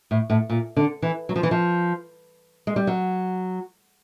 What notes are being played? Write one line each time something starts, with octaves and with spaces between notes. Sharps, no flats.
A2
A2
A#2
D3
E3
F#3
F3
E3
F3
G#3
G3
F#3